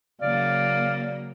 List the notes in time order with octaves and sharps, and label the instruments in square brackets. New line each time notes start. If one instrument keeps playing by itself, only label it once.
[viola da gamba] C#3 F#3 A#3 [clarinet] D5 [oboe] F5